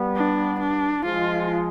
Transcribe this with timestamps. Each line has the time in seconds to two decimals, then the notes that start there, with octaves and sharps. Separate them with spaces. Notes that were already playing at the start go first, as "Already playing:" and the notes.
Already playing: G3 B3
0.16 D4
0.60 D4
1.04 F3 G#3 F4